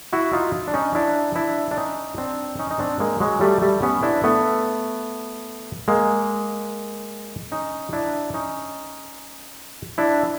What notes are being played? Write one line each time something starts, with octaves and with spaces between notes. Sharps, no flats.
E4 F#4
D#4 F4
D4
C#4 D#4
D4 E4
D4 E4
D4
C#4 D#4
C4 D4
C#4 D#4
D#4
C4 D4
G#3 A#3
F#3 G#3
G3 A3
G3 A3
B3 C#4
D4 E4
A3 B3
G#3 A#3
C#4 D#4
D4 E4
C#4 D#4
D4 E4